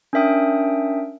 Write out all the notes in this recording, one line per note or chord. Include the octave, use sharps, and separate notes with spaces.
C#4 D4 A#4 E5 G5 D#6